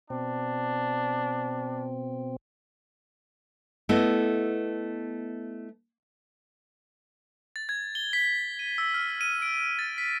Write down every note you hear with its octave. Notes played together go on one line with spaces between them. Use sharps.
B2 C4 D4
A3 B3 E4 D#5
A6
G#6
G7
B6
D#7
E6
F6
D#7
D7
A6
B6